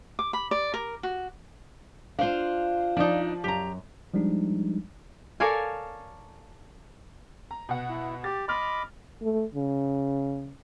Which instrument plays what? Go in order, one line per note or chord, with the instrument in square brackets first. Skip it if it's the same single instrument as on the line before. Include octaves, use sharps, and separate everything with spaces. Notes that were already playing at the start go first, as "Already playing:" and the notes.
[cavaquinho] D6
B5
D5
A#4
F#4
[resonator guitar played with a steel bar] D4 C5 [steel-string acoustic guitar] F4 F5
[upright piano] F3 D5 [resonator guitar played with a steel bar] D4 D#4
[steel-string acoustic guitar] F#2 [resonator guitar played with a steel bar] G4 A#5
[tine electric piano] F3 G3 G#3 D4 D#4
[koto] A4 A#4 C#5 D5 F5 G#5
[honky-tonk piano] A#5
B2 F#5
[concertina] E4
[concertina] G4 [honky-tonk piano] A6
[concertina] D#5 B5 D6 [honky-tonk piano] C6 F6
[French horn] A3
C#3